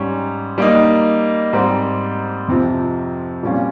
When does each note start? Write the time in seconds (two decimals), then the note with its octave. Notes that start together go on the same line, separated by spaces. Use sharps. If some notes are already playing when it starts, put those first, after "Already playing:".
Already playing: G#2 G3 C#4
0.58 G3 A#3 D#4
1.53 G#2 G3 C4
2.48 F2 C3 F3
3.43 A#2 G3 C#4 F4